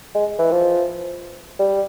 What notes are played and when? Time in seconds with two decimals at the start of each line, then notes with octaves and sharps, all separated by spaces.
0.15 G#3
0.39 E3
0.51 F3
1.59 G3